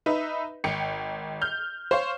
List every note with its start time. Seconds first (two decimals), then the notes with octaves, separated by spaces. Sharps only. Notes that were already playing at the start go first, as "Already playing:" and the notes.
0.06 D#4 B4 E5
0.64 G#1 G5 C#7
1.41 F6 G6
1.91 C5 C#5 F5